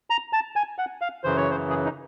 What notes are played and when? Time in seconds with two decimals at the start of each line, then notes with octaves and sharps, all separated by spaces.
0.10 A#5
0.33 A5
0.56 G#5
0.78 F#5
1.01 F5
1.24 F#2 C#3 E3 C5
1.37 C#5
1.51 C5
1.70 G#4
1.85 D#4